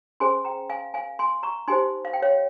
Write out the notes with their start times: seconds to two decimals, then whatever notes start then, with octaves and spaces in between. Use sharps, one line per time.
0.20 C#4 G#4 C5 G#5 C6
0.45 G5 A#5
0.70 F5 G#5
0.94 F5 G#5
1.19 G#5 C6
1.43 A#5 C#6
1.68 D#4 G4 C5 G#5 C6
2.05 F5
2.13 G5
2.22 C#5 F5